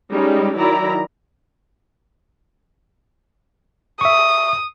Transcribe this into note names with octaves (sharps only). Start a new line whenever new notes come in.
G3 G#3 C#4 D#4
D#3 F#3 E4 D5 A#5
E5 C#6 D#6